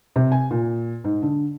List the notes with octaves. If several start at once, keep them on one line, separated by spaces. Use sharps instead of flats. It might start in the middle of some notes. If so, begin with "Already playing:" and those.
C3
G#5
A#2
G#2
D3